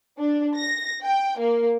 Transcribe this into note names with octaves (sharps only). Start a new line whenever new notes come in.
D4
A#6
G5
A#3